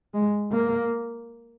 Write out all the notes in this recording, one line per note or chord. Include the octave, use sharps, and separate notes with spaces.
G#3
A#3